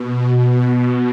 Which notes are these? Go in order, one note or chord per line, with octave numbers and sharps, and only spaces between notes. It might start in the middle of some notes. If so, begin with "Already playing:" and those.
Already playing: B2